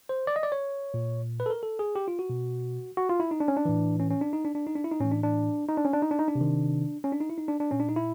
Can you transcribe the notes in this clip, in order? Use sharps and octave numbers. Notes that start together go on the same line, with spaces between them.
C5
D5
D#5
D5
C#5
A#2
B4
A4
A#4
A4
G#4
G4
F4
F#4
B2
F#4
F4
E4
D#4
D4
C#4
D4
A2 E3
C#4
C#4
D4
D#4
D4
D4
D#4
D4
E4
D#4
A2 E3 C#4
D4
D4
D#4
D4
C#4
D4
D#4
D4
D#4
D4
C3
D#3
C#4
D4
D#4
E4
D#4
D4
D4
A#2 C#4
D4
D#4
E4